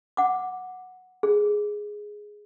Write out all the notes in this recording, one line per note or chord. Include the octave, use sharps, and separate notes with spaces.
F#5 D6
G#4